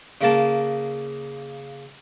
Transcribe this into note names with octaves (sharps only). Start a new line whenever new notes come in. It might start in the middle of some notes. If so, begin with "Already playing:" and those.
C#3 A#3 A5